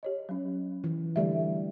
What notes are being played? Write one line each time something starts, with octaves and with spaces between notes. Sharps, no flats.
G4 C#5 D#5
F#3 C#4
E3
D3 E3 G3 A3 D5 E5